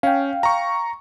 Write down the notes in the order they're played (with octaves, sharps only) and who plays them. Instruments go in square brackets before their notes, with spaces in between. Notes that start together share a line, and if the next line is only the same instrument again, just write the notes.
[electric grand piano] C#4 [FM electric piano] F5 G5
[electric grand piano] A#5 C#6